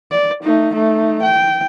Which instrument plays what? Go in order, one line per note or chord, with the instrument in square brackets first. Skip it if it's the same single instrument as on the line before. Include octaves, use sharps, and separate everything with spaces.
[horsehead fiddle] D5
A3 D#4
A3 D#4
G5